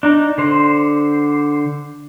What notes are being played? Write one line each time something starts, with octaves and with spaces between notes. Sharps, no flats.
D4 D#4
D3 C5